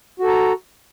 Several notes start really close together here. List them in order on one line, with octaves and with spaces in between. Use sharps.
F#4 A4 A#5